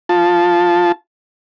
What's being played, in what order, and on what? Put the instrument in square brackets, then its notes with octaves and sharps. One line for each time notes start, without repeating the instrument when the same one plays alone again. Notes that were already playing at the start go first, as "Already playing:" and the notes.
[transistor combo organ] F4 A5